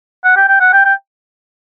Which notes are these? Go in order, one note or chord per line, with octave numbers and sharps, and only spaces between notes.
F#5
G5
G5
F#5
G5
G5